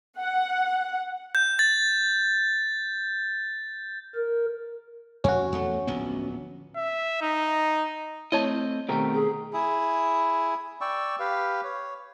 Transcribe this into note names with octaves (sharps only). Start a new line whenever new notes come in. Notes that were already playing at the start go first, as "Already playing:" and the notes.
F#5
G6
A6
A#4
F2 C#4 F#4
E2 A3
D1 A#1 B3
E5
D#4
A3 C4 E4 C#5 D#5 A5
B2 D#3 A3 C4 G4 A#4
G#4
E4 G#4
D5 G5 C#6 E6
G4 B4 F5
C#5